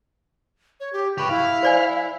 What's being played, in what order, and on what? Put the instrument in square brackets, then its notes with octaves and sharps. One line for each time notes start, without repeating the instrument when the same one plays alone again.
[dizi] C#5
G4
[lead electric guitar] G4 B4 [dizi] C#6
[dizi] E4 [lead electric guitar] F5
[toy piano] C5 D5 G#5